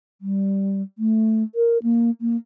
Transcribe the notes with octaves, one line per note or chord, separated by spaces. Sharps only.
G3
A3
A#4
A#3
A#3